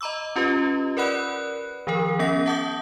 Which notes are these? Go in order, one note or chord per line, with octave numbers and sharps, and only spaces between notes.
D#5 A#5 B5 D6 E6
C#4 F4 G4 B4 D#5
A#4 B4 D5 F#5 B5 F#6
D#3 F3 G#4 A#4
B3 C#4 F#5 A#6
E5 F#5 A5 D6 D#6 G6